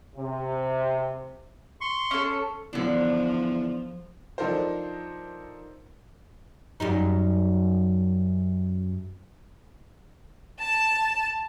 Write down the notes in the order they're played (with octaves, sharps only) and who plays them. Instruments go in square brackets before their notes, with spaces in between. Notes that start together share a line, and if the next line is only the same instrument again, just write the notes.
[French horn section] C3
[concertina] C6 C#6
[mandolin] C#4 A4
[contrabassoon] E2 [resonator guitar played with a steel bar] D3 D4 [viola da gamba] F3
[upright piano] F3 D4 D#4 A4 A#4 C5
[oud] F#2 G3 D#4
[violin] A5 E7